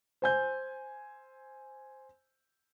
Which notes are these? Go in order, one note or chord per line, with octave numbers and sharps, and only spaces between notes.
C5 G#5 G6